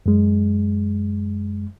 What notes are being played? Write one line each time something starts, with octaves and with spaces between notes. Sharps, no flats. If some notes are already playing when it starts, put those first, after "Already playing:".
F#2 G#3